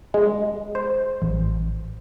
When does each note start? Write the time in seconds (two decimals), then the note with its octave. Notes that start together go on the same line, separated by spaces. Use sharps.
0.14 G#3
0.75 C5
1.22 A1